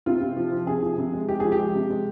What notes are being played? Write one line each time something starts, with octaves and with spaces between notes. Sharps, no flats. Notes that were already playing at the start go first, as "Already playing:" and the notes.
C3 F4
C3
F3
F3
C3 G#4
F3
C3
G#3
G#3 G4
F3 G#4
G4
G#3
C3
G#3